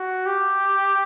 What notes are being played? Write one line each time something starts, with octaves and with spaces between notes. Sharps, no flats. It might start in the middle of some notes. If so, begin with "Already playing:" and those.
Already playing: F#4
G4